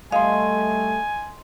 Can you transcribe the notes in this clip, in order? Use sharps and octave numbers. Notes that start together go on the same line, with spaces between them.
G3 A3 D#5 F5 G#5 C6